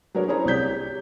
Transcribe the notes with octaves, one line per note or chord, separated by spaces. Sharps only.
F#3 D4 G#4 A#4 B4 C#5
C#4 E4 G#4 C5 C#5 A#5
C2 C3 D5 G6 B6
G4